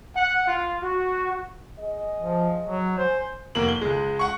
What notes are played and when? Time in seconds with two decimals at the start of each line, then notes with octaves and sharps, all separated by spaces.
0.15 F#5
0.47 F4
0.82 F#4
1.78 G#4 D#5
2.19 F3
2.65 F#3
2.98 C5 G#5
3.55 F1 A#3 F#7
3.68 G7
3.81 C#2 G#3
4.19 F#5 C#6